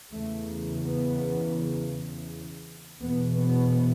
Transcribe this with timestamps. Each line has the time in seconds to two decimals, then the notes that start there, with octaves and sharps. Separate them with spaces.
0.11 E2 C#3 A3
0.83 B3
3.00 E2 B2 B3
3.37 B3